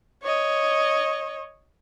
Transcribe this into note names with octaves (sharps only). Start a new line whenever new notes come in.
C#5 D#5